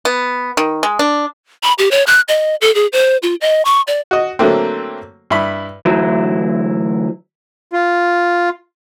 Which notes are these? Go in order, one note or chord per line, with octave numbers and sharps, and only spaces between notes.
B3
D#3
G#3
D4
B5
G4
C#5
F#6
D#5
A4
G#4
C5
F4
D#5
C#6
D5
F#4 D#5
D3 F#3 A3 A#3 C4
G2 E4 B5
D2 E3 F#3 E4
F4